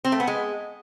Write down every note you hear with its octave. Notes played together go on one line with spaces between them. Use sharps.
C4
A3
B3
G#3